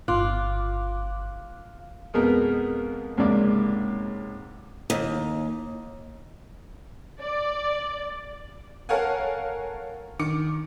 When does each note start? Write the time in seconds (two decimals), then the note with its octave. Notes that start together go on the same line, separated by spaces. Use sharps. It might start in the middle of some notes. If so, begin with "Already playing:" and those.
0.08 G1 F4 D6 F#6
2.14 F2 B2 G#3 B3 A#4
3.17 C#2 G#2 C3 A#3 D5
4.90 D#2
7.20 D5
8.89 A4 A#4 C#5 F5 F#5 G#5
10.19 D#3 D6 C#7